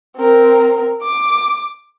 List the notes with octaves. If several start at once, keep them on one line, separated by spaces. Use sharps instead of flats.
C4 A#4
D6